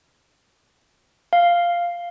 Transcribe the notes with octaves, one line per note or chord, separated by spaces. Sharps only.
F5